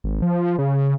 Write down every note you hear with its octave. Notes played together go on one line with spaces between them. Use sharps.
G#1
F3
C#3